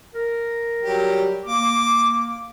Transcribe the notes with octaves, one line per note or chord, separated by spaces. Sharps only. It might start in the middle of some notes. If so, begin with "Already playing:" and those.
A#4
F#3 G3 G4
A#3 D6